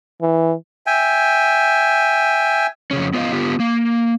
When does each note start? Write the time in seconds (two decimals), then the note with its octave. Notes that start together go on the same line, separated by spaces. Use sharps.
0.22 E3
0.87 E5 G5 G#5
2.91 F2 C#3 C#4
3.14 B3 F4 C5 D#5 F5
3.33 D3 B3 F4 G4
3.60 A#3